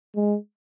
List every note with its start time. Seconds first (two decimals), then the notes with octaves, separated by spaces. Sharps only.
0.16 G#3